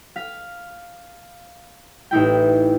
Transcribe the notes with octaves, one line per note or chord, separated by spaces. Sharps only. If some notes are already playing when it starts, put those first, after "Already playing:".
F5 B6
A1 D#4 E4 G5